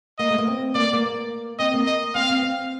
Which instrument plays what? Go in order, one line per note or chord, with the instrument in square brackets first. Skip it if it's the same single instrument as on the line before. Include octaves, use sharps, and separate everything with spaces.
[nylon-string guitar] A#3 [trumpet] D#5
[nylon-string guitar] A3
A#3
C4
[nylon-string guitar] A#3 [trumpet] D5
[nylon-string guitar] A#3
[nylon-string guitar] C4 [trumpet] D#5
[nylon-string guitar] A#3
[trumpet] D#5
[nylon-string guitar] C4 [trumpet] F5
[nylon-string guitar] C4
C4